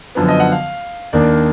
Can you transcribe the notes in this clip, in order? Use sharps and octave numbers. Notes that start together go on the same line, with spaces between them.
F#2 D3 F3 B3
D#5
F#5
F5
D#2 D#3 A#3 D4 D5